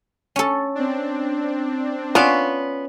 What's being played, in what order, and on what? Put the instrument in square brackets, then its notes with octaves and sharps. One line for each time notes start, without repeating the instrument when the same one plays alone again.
[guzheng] C#4 A4
[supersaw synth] C4 D4
[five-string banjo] B3 F4 F5 [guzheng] C#4 D5 A5